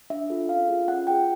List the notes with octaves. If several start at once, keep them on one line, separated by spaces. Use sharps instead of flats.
D4 E5
F4 A4
C#4 F5
F4 G#4
C#4 F#5
F4 G#4 G5